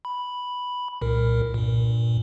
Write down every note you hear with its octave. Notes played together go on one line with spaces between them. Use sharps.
B5
C2 A#2 A#4
G2 A#2